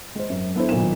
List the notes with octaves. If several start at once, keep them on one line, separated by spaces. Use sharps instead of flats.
G#3 C5
F#2
B3 D4 E4 A4 C5
B1 A#2 D#3 E7